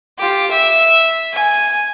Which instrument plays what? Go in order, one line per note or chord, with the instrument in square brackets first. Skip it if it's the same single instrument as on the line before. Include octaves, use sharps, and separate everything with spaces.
[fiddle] F4 G4
E5
G#5